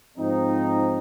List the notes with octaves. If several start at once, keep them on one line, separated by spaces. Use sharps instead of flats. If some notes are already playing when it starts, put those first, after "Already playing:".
G#2 F3 C4 D#4